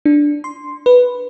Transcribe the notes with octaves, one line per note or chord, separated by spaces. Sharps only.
D4
C6
B4